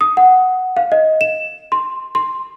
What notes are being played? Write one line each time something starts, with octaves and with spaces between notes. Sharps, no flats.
D#6
F#5
F5
D#5
E7
C6
C6